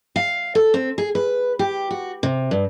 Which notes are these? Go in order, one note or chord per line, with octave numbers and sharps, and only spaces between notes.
F5
A4
C4
G#4
B4
G4
F#4
C3
G2